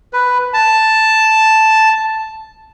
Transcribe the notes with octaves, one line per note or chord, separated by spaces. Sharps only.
B4
A5